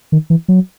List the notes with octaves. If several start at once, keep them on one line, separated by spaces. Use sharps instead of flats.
D#3
E3
F#3